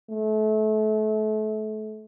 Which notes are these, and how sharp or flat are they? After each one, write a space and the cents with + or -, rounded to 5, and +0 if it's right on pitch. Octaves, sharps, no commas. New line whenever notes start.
A3 -30